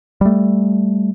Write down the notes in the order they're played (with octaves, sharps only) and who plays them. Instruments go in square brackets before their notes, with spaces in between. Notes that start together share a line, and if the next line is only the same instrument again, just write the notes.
[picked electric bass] G3 A3